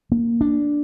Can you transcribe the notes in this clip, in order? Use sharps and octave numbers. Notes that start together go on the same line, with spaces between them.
A#3
D4